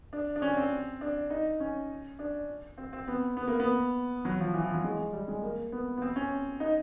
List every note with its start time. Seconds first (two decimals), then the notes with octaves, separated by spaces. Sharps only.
0.13 D4
0.36 D4
0.42 C#4
0.57 C4
1.01 D4
1.30 D#4
1.60 C#4
2.19 D4
2.78 C4
2.93 C4
3.08 B3
3.37 B3
3.48 A#3
3.60 B3
4.25 F#3
4.40 F3
4.54 E3
4.64 F3
4.74 F#3
4.84 G#3
5.13 G3
5.28 G#3
5.43 A#3
5.72 B3
5.97 B3
6.02 C4
6.16 C#4
6.60 D#4